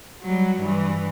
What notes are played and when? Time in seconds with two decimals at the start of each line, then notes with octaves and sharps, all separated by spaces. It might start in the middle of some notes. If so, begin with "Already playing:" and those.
0.22 F#3 G3
0.60 G2 E3